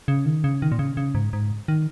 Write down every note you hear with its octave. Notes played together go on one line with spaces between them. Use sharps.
C#3
D#3
C#3
D#3
A#2
C#3
C#3
G#2
G#2
D#3